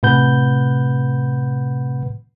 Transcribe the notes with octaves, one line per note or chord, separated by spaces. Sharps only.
A2 C3 B4 F#5 G6